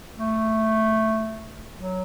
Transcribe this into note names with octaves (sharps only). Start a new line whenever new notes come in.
A3
F#3